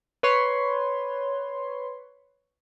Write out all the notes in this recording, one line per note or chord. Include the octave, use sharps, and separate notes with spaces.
B4 C#5 C6